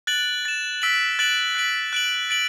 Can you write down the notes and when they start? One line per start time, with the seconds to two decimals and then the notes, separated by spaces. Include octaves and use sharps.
0.07 F#6 A6 D7 F#7
0.45 A6 E7
0.82 E6 B6 D7 F#7
1.19 F#6 A6 D7 F#7
1.55 F#6 B6 D7 F#7
1.93 F#6 D7 F#7
2.30 A6 D7 F#7